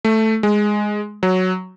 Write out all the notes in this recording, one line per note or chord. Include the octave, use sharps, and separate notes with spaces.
A3
G#3
F#3